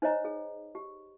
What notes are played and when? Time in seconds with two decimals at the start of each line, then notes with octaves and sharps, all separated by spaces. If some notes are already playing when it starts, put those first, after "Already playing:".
0.02 D#4 C5 C#5 D#5 A#5
0.25 G#4
0.75 G4